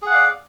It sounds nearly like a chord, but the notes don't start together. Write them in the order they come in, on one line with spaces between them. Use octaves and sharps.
G#4 F#5 F5 D5